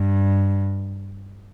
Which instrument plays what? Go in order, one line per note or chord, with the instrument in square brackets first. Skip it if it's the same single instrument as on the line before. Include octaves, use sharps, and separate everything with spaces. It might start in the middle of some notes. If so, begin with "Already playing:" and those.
Already playing: [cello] G2